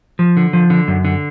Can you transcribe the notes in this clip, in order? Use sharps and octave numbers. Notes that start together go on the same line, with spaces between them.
F3
D3
F3
D3
F#2
D3